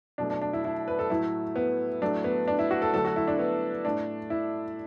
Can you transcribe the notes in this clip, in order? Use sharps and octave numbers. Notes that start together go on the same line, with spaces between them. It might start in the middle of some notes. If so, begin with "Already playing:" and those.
B2 F#3 A3 D4
D4
D4
E4
E4
B4
A4
A2 F#3 A3 E4
B3
A2 F#3 A3 D4
B3
D4
E4
F#4
A4
D3 F#3 A3 A4
F#4
E4
D4
B3
A2 A3 D4
E4